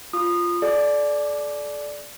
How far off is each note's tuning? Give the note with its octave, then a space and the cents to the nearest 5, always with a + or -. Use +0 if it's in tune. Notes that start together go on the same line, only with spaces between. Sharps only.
F4 +0 D#6 -20
A4 -45 D5 +0